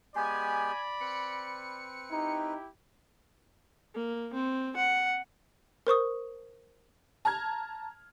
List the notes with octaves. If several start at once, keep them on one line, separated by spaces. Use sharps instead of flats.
G#3 B3 G4 D5 G#5 B5
C4 B4 C#7
D#4 E4 G4
A#3
C4
F#5
A#4 C5 C#6 D#6
A5 A#5 F6 G#6